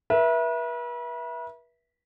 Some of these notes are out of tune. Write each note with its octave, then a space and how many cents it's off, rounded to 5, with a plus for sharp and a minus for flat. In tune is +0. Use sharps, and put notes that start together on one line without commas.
B4 -40 E5 +0